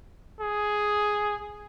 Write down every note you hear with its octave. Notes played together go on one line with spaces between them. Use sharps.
G#4